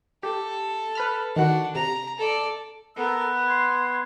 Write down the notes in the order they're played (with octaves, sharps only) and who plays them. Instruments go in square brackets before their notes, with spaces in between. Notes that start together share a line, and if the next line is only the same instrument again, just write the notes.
[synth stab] G4 [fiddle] A4
[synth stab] B4 B5 F6
[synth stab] D#3 F#4 [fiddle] D4 F#5
[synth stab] C3 [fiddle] A#5
[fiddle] A4 D5
[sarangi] B3 [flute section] A4 A#4 E6
[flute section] C6 G#6